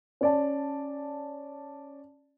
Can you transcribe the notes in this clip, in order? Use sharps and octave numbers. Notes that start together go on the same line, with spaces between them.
C#4 D5 A5